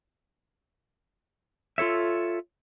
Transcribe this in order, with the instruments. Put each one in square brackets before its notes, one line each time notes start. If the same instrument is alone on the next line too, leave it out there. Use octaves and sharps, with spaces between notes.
[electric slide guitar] F4 A4 C#5 E5